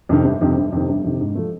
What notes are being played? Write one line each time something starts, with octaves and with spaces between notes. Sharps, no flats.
F2 C3 D#3
G1
F2 C3 D#3
G1
F2 C3 D#3
G1
F2 C3 D#3
G#2
F3 A3